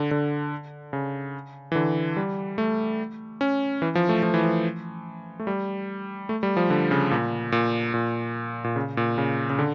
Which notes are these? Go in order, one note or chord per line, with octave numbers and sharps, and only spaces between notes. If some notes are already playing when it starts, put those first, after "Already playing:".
Already playing: D3
D3
C#3
E3
D3
G3
A3
C#4
E3
F3
A3
F3
E3
F3
A3
G3
A3
G3
F3
D3
C#3
A#2
A#2
A#2
A#2
C#3
A#2
C#3
C#3
D3